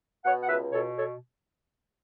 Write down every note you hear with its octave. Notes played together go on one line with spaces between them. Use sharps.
B2 C#5 F#5
F#5
C#2 B4 E5
B2 A4 C#5
A4 C#5